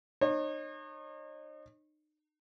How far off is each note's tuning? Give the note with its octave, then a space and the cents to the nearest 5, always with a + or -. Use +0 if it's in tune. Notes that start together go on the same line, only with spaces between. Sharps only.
D#4 -35 C#5 -40